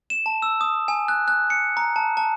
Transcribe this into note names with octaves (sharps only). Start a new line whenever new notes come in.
E7
A5
E6
D#6
G#5
F#6
F#6
C#7
A#5
A5
A5